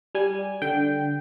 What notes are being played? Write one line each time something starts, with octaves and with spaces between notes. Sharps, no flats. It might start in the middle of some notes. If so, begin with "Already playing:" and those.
G3 G#5
D3 G5